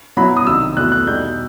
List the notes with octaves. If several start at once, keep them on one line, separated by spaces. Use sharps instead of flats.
B2 F#3 B3 E4 B5
D#6
C2 C3 D#3 E6
E2 B2 A3 E4 F#6
F#6
B2 G3 D#4 G6